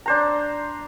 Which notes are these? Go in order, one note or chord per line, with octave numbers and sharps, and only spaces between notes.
D4 C5 A#5